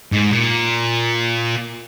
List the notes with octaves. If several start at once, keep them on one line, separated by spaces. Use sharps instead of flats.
G#2
A#2